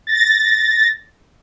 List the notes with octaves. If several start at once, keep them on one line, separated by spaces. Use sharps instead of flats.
A6 A#6